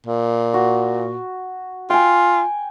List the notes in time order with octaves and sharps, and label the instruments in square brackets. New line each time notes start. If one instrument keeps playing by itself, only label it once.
[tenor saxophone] A#2
[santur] F#4
[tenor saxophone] F4 [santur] G5 G#5